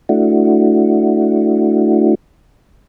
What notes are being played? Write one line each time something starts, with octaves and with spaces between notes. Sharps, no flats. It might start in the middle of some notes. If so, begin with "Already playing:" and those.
A3 D4 E4 F#4